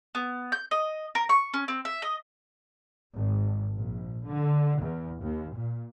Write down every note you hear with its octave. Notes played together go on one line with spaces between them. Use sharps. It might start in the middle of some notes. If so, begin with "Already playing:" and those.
B3
G6
D#5
A#4
C#6
C#4
C4
E5
D#5
G#1
A#1
D3
E2
D#2
A#2